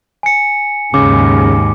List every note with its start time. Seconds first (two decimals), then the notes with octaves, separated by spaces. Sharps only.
0.23 G#5 C#7
0.94 D#2 G#2 C#3 D6